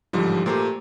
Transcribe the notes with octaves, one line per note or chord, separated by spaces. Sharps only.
A1 G#2 D3 F3 G3
A#2 A3 G4 C5 A#5 D6